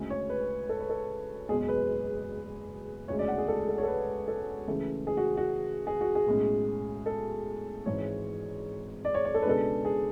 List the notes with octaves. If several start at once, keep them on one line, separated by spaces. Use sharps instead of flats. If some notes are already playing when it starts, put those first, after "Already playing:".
Already playing: D2 C#3 G#3 C#4
C#5
B4
A4
B4
A4
F#1 E2 B2 G#3 G#4
B4
E1 D2 C#3 G#3 C#5
D5
F#5
G#4
A4
A4
C#5
A4
B4
A4
C#2 C#3 E3 A3
G#4
F#4
F#4
G#4
F#4
G#4
B1 A2 G#3 C#4
A4
G#1 G#2 E3 C#5
D5
C#5
C#5
A4
B4
C#2 B2 G#3 D4 A4
G#4